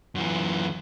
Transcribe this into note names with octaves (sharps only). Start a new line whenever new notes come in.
F#2 E3